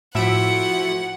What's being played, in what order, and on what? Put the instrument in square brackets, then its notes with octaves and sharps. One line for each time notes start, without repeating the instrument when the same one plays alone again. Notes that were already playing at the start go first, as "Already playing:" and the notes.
[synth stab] A2 E5 D7 [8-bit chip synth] F3 E4 [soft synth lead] F#4 [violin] F#5